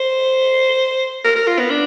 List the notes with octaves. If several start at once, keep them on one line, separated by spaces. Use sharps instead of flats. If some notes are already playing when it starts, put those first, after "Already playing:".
Already playing: C5
A#4
A#4
F4
B3
D4